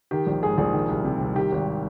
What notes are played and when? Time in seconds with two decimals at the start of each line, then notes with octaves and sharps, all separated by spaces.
0.11 D#3 G4
0.27 A#1
0.43 G#2 G#4
0.58 A#1 G#4
0.73 D#3
0.89 C2
1.04 C3
1.21 C2
1.36 D#3 G4
1.52 G#1